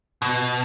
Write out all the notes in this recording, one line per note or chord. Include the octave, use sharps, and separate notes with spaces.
B2